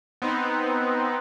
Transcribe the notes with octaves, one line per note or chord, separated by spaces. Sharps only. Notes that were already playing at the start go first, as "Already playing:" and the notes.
B3 C4 D#4